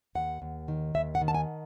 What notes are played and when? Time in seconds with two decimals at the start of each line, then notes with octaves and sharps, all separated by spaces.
0.15 D#2 F#5
0.42 D#2
0.68 D#3
0.95 D#2 E5
1.15 F#5
1.21 D#3
1.28 A5
1.35 G#5